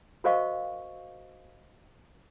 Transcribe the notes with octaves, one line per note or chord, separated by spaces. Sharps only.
F#4 A#4 C5 D#5 F5 C#6